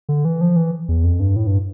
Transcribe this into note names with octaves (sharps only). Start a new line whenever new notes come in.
D3
E3
F3
E3
E2
F2
G2
A2
G2